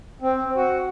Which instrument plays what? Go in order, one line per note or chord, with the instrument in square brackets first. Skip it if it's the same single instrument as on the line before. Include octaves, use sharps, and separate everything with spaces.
[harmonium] C4
F#4